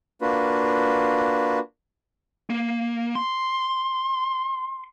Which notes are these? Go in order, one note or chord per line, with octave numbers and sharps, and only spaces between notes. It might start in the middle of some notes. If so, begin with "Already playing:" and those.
A#3 D4 F4 F#4 B4
A#3
C6